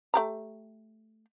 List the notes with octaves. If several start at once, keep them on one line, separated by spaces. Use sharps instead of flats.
A3 G4 A#5